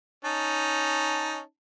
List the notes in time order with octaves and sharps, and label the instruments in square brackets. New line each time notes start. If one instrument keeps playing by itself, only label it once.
[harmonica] C#4 D#4 A5